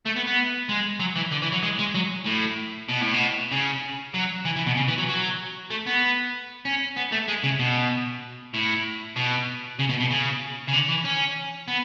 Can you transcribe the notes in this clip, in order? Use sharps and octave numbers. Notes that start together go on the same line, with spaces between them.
A3
B3
B3
G#3
F#3
E3
D3
E3
F#3
G#3
G#3
F#3
A2
B2
A2
B2
C#3
F#3
E3
E3
B2
C#3
E3
F#3
F#3
A3
B3
C#4
B3
A3
G#3
C#3
B2
A2
B2
C#3
B2
B2
C#3
C#3
D3
E3
C#4
B3